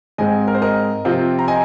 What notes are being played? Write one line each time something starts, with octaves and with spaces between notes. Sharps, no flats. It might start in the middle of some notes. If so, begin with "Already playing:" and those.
G#2 G#3 C4 D#5 G#5
A#4
C5
A#4 D#5
C3 F3 C4 F4
A#5
D#5 G#5